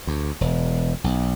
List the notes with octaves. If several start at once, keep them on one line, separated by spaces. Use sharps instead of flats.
D2
E1
B1